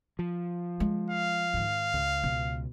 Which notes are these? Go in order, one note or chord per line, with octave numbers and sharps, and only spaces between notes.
F3
G#3
F5
G#2 D#3
C#2
B2